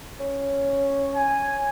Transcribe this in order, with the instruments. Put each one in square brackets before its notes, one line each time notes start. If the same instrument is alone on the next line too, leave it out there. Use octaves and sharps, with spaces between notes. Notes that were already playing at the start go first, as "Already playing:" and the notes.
[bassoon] C#4
[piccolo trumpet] G#5